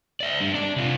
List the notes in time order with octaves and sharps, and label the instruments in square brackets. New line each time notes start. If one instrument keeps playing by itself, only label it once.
[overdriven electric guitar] D5 E5
G3 D4
D4 D5
C3 F4